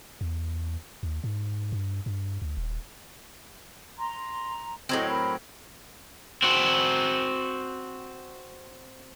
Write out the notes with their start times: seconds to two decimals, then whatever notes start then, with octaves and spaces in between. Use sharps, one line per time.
0.21 E2
1.03 D#2
1.24 G#2
1.72 G2
2.06 G2
2.42 D2
2.57 D#1
3.97 A#5 C6
4.89 A2 F#3 C4 D#5
5.10 A#4 B5
6.42 C4 F#4